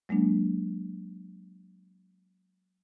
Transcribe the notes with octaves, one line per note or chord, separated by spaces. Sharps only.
F#3 G#3 A#3 D4